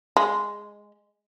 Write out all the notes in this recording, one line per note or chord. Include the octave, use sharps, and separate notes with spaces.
G#3